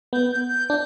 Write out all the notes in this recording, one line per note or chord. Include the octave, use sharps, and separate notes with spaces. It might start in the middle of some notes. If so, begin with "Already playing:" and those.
B3 G6
G6
G6
D4 G6